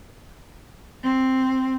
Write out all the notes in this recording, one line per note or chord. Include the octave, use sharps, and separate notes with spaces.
C4